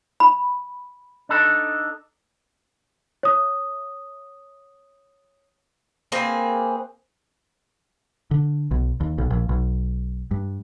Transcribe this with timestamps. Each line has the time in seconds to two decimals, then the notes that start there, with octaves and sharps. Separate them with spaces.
0.20 B5
1.29 D4 D#4 A4
3.23 C#5 D#6
6.12 A#3 C4 G#4 B4
8.31 D3
8.71 B1
9.01 D#2
9.18 B1
9.30 A#1
9.49 B1
10.31 G2